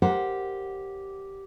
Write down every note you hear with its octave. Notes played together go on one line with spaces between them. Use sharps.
G4 A#4 C5 D5 F#5